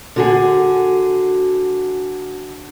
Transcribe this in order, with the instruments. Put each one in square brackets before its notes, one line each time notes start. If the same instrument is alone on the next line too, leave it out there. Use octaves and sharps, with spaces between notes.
[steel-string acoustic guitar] D3 F#4 G#4